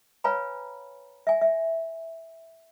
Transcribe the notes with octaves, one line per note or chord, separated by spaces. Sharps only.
B4 C#5 F5 G#5 A#5 B5
E5 G#5
E5